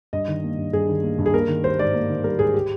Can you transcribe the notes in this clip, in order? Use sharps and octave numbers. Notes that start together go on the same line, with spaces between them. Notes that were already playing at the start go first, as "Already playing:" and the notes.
G2 D#5
D#3
A#3
G2
G2 G#4
D#3
A#3
G2
G#4
A#3 A#4
D#3
G3 C5
G#2 D5
A#3
D#3
G3 A#4
G#2 G#4
G4